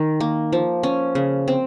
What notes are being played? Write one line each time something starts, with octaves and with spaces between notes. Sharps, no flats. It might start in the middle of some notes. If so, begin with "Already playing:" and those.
Already playing: D#3
A#3
F3
C#4
C#3
C4